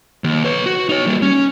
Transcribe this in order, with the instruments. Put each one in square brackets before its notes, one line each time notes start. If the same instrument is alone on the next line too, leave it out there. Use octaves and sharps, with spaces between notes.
[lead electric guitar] D#2
B4 C#5
F#4
D#4 C#5
G3 A#3
C#4